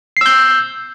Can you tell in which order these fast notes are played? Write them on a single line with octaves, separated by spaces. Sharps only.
C7 E6 G6